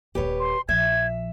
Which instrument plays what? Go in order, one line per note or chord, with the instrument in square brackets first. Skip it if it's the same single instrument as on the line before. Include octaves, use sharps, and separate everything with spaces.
[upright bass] D#1 A#3 [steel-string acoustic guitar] G4 B4 C#5
[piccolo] C6
[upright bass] A#1 F3 [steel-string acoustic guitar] E5 [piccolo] G#6